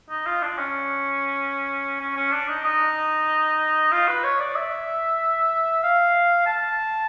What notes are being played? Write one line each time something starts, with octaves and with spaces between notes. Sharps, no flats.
D#4
F4
D4
C#4
C#4
C#4
D4
D#4
D#4
F4
B4
C#5
D5
E5
F5
A5